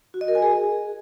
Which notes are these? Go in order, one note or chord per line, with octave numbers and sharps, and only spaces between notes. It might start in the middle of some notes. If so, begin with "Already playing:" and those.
F#4
D#5
A#4
G#5
G#4